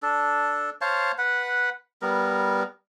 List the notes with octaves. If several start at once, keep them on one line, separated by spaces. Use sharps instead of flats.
D4 A4
C5 C#5 F5 A5
B4 F#5
G3 B3 A#4